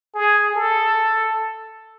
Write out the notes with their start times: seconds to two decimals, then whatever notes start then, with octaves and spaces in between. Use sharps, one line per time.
0.15 G#4
0.55 A4